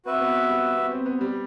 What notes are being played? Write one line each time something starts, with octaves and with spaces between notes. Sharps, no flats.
C4 F#4 B4 E5
B3
G3
B3
C4
B3
G3